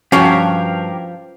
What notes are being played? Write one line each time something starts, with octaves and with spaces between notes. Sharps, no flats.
G2 F3 C#4 F#4 G4 A#4 F5